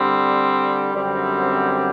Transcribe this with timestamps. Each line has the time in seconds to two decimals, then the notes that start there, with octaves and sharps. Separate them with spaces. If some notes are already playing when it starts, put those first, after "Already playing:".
Already playing: D3 G3 C4
0.93 F#2 D3 G3 C4